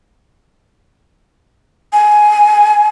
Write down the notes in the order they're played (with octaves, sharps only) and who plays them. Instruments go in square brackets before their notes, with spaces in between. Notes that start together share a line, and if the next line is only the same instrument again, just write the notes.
[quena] G#5